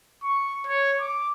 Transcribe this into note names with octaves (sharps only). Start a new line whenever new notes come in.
C#6
C#5
D6